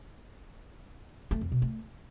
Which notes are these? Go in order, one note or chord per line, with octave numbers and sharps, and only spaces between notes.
A3
F2
B2
A3